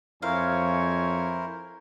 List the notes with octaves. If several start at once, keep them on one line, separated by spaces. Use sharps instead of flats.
F2 E4 A#4 C5 C#5 F5 G#5 C#6